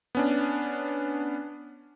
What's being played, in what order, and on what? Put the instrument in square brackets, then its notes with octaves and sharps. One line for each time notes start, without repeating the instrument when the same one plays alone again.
[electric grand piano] B3 C#4 D4